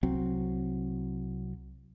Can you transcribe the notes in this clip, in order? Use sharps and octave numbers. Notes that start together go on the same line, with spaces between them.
C2 F#3 C4